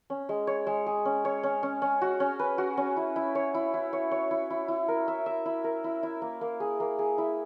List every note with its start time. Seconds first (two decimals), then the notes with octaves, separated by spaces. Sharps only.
0.10 C#4
0.29 G#3
0.47 C#5
0.67 G#3
0.86 G#4
1.05 C#4
1.25 C#5
1.43 C#4
1.63 C#4
1.82 C#4
2.01 F#4
2.20 C#4
2.39 B4
2.58 F#4
2.77 C#4
2.97 E4
3.16 E4
3.35 C#5
3.54 E4
3.74 E4
3.93 C#5
4.11 C#5
4.31 E4
4.50 E4
4.68 E4
4.88 A#4
5.08 E5
5.26 E5
5.45 E4
5.64 A#4
5.84 E4
6.03 E4
6.22 A#3
6.41 A#3
6.60 G#4
6.80 A#3
6.99 G#4
7.18 E4